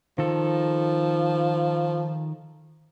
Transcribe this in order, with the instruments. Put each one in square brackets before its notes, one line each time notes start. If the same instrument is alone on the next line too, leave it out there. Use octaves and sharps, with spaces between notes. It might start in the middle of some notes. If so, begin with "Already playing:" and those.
[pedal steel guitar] D#3 A4 [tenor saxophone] F3